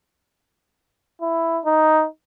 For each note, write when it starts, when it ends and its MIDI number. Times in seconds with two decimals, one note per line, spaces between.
1.21 1.60 64
1.65 2.06 63